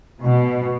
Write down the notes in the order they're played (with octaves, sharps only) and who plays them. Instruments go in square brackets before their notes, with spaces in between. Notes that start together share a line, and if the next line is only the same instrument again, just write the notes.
[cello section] B2